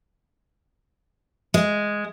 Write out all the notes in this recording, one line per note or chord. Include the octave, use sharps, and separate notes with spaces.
G#3